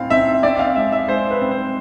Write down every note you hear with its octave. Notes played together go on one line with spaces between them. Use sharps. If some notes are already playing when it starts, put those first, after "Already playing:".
Already playing: A2 C4 F5
C4 E5
C4 D5
F5
G#3 E5
E5
G#3 C5
B4
C4
C5